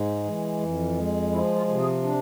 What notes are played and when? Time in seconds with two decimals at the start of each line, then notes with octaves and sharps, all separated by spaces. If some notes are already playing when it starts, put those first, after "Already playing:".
Already playing: G#2 G#3
0.24 E3
0.60 F2
0.97 G#3
1.32 F3 E4
1.56 F4
1.68 C3
1.80 G#4
2.03 D4